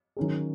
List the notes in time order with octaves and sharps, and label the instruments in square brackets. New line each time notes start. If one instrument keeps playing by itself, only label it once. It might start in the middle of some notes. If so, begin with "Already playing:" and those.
[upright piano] D#3 F#3 C#4 G#4